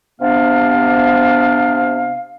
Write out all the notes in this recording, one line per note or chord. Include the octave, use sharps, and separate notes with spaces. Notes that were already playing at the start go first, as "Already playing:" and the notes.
C3 B3 D4 F5